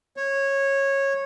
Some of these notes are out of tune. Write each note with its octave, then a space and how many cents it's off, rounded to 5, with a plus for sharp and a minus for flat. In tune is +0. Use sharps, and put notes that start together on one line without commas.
C#5 -15